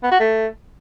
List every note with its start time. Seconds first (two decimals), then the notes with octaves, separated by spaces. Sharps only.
0.03 B3
0.11 F#4
0.20 A3